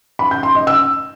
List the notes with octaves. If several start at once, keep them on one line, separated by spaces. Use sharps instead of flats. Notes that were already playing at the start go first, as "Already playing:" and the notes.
B5
G6
C6
D#5
E6